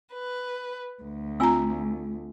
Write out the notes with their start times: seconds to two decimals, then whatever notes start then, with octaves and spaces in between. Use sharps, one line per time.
0.13 B4
1.02 D2
1.40 C4 F4 G#5 A#5 E6